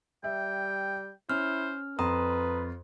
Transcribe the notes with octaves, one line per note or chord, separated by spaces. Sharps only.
G3 E5 G5
C#4 E4 C5 F6
F2 F4 B4 A#5 C6 D#6